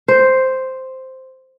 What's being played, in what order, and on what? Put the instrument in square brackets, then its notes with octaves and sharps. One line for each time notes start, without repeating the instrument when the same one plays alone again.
[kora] C5